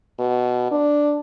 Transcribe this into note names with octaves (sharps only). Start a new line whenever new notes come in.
B2
D4